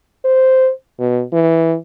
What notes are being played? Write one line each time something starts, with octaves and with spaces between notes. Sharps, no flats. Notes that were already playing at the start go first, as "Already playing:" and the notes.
C5
B2
E3